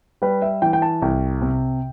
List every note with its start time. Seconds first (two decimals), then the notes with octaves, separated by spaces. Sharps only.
0.22 G3 B4
0.42 E5
0.62 E3 G5
0.73 G5
0.82 A5
1.02 C2 G5
1.41 C3